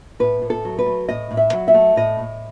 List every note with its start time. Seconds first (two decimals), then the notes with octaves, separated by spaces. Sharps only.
0.19 A2 B4
0.42 A2
0.50 A4
0.65 F#3
0.79 B4
0.86 A3
1.09 A2 D#5
1.31 A2
1.37 E5
1.53 F#3
1.68 E5
1.74 A3
1.96 A2 D#5
2.19 A2